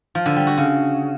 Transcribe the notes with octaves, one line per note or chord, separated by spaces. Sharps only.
F3
D3
G3
F#4
C#3